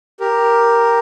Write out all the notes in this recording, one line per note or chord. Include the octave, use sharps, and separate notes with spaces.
G4 A#4